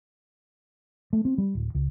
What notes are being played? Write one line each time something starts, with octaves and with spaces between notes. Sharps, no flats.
A3
C4
G3
D1
C#2